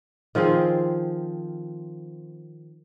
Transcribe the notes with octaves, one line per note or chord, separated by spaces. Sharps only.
D#3 F3 C4 G#4